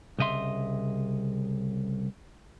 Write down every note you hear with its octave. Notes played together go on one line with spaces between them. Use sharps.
C2 C#3 D#5 E5 C6